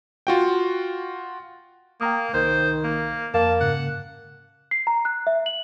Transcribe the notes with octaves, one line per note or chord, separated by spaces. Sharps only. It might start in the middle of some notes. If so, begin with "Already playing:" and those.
F4 F#4 G5
A#3 G5 A#5 D#6
C2 D#3 C5
A#3
F2 A#3 F5 A5
G#2 C#3 F#5
C7
A#5
F#6
E5
F#7